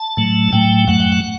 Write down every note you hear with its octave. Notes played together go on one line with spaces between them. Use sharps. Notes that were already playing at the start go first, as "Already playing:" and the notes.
Already playing: A5
A2 F#3 A3
A2 F#3 A3 G5
F#2 F#3 A3 F#5
G5
F#5